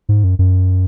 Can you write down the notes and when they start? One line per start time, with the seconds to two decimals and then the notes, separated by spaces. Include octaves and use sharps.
0.09 G#2
0.24 F#2
0.39 F#2